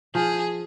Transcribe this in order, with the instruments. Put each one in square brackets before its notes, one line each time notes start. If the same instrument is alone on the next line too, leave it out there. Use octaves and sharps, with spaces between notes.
[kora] F3 [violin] G#4